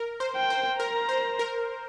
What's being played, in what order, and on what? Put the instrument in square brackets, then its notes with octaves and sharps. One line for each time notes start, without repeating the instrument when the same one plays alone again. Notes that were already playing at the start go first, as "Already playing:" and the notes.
Already playing: [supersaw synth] A#4
C5
[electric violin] G5
[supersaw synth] C5
[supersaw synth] A#4 [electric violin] A#5
[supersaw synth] C5
A#4